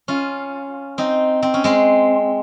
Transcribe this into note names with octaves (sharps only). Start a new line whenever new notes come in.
C#4 F4
C4 D#4
C4
C#4
G#3 C4